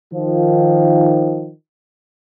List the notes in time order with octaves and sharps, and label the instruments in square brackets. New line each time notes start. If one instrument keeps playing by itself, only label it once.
[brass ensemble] D#3 F3